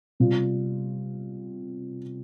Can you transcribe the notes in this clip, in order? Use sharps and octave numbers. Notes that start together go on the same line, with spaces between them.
C3 G3 C4 F4